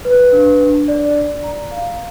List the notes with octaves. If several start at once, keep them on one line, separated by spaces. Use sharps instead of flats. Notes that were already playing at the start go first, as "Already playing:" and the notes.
B4
D4
D4
D5
D5
A#5
F5